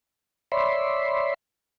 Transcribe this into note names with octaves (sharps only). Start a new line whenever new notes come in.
C#5 D5 E5 B5 C6